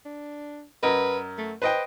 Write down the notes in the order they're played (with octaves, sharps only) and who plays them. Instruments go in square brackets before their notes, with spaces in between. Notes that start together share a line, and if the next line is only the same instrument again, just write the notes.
[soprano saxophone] D4
[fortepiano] F#2 A#4 D#5 [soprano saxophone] B4
[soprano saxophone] A3
[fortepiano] B4 D#5 G5 [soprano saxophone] C5